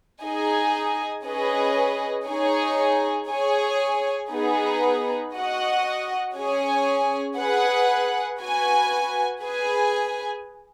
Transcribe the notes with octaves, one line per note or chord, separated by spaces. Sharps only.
D#4 G#4 D#5 G#5
C#4 G#4 B4 D#5
D#4 G#4 C#5 G#5
G#4 C#5 G#5
B3 D#4 G#4 B4
F#4 D#5 F#5
C#4 G#4 C#5 G#5
G#4 B4 F#5
F#4 B4 G#5
G#4 B4 G#5